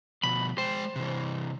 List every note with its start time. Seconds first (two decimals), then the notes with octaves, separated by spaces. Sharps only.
0.23 B2 F3 B5
0.58 G#3 C5 G5
0.96 C3 E3